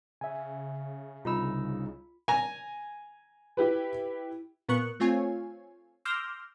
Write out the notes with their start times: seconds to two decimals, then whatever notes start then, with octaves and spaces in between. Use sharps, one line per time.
0.21 C#3 E5 G#5
1.25 C2 D#4 F4 B5 E6
2.28 G#5 A#5
3.57 E4 G4 B4
4.69 A#2 B3 A#4 C#6 F#6
5.00 A3 C4 F4 C#5 G#5
6.05 C6 D6 E6 F6 G6 A#6